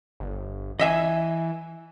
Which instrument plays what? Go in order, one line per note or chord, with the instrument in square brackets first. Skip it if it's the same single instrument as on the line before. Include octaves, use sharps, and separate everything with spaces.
[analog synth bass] G1
[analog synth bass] E3 [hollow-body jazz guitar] D#5 E5 G#5